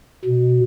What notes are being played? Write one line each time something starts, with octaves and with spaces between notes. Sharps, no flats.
B2